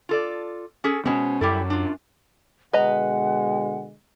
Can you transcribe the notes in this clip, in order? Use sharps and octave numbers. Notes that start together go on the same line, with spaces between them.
F4 A4 D5
C#4 G#4 A4
B2 G#3 C4 C#4 C5
F#2 G3 E4 A4
D4 F4
B2 D3 G#3 B4 D#5 F#5 A#5